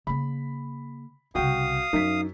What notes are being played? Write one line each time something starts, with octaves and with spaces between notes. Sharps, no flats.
C#3 A#3 B5
C2 C#3 F#4 F5 G5 D#6
F#2 D4 D#4 B6